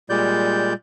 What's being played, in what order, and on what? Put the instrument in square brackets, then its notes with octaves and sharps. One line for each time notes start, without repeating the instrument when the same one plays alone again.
[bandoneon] A#2 G3 G#3 D5 G6